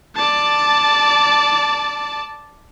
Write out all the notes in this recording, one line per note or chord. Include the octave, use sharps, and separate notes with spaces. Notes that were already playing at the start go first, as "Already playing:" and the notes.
D5 A5